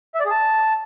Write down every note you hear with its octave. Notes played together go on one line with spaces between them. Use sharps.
E5
D5
G#4
A5